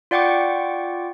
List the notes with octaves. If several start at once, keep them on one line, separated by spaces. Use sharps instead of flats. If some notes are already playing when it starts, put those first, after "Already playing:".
F4 D5 F#5 G5 C#6 D6